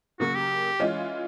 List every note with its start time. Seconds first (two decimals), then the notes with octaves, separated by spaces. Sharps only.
0.20 C#3 F#3 A#3 F#4
0.35 G4
0.80 E3 G#3 C#4 F4